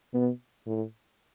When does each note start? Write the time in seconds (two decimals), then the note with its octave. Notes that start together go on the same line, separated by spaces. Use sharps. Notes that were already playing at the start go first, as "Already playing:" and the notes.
0.13 B2 B3
0.66 A2